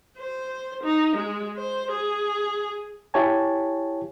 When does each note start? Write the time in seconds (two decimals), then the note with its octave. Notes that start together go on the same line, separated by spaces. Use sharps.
0.17 C5
0.83 D#4
1.16 G#3
1.57 C5
1.91 G#4
3.14 E4 G4 C#5 G#5 A5